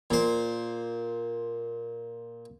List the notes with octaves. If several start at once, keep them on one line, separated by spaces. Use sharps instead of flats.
A#2 C5